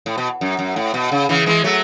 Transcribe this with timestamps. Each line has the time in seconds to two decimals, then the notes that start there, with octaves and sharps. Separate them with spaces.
0.06 A2
0.18 B2
0.41 F#2
0.59 F#2
0.76 A2
0.94 B2
1.12 C#3
1.29 C#3 E3
1.46 E3 G#3
1.64 F#3 A3